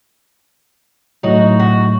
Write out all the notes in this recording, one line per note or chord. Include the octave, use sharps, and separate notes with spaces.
A2 F#3 A3 D#4 F#4
F#4